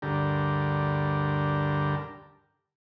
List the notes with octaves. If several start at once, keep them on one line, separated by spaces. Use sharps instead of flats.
D2 G2 D3 G4 A#4